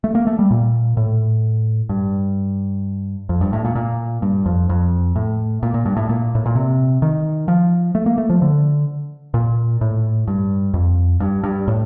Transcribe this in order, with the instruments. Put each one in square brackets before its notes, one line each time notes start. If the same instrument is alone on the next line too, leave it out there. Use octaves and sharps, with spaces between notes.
[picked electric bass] A3
A#3
A3
G3
A#2
A2
G2
F2
G2
A2
A#2
A#2
G2
F2
F2
A2
A#2
A#2
G2
A2
A#2
A2
A#2
C3
D#3
F3
A3
A#3
A3
F3
D3
A#2
A2
G2
F2
G2
G2
A2